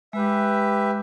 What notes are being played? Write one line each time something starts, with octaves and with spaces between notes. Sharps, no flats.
G#3 G4 B4 E5